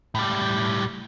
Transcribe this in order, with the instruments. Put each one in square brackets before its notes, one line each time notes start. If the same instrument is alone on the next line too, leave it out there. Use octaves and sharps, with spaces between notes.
[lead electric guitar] A2 G3